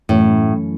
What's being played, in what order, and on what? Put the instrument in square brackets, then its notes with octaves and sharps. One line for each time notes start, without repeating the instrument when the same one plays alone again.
[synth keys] F#2 E3 A3 C#4 [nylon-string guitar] A2